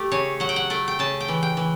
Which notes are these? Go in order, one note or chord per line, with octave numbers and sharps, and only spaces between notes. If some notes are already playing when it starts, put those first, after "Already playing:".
Already playing: A3 G4
C#3 C#5
F#3 F#5
G5
F#5
A3 G5
G5
C#3 A5
G5
E3
G5
E3